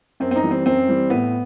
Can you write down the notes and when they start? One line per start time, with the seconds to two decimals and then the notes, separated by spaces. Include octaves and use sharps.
0.20 F#2 C4
0.31 C4
0.36 D#4
0.43 E3 G3
0.51 C4
0.66 F#2 C4
0.88 E3 G3
1.10 A2 B3